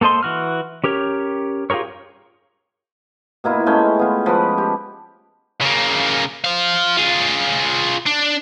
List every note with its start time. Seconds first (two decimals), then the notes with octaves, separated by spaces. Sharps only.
0.01 A#3 A4 C5 D#5 C6
0.23 E3 F#4 F6
0.84 C#4 G4 A#4 C#5
1.70 F4 G4 G#4 A#4 C#5
3.44 B2 A#3 E4 F4
3.66 G#3 A3 C#4 G5
3.99 B3 F4
4.26 F3 B4
4.58 G4
5.61 C#3 A#3
6.44 C5 F5
6.97 F4 G#4
8.06 D4